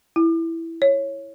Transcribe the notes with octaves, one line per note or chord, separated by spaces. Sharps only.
E4
C#5